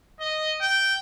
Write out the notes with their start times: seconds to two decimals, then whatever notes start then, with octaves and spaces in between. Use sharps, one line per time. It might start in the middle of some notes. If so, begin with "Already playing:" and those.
0.20 D#5
0.61 G5